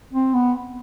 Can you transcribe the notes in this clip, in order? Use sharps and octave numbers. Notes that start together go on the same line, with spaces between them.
C4
B3